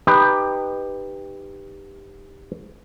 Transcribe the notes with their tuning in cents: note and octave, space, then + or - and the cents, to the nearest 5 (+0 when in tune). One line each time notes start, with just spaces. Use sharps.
D#4 -20 G4 +10 B4 +0